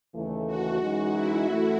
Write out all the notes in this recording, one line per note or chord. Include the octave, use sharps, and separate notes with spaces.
D#2 C#3 E3 A3
F#4
F#2 E3 G#3 D#4
E4
F#2 E3 A3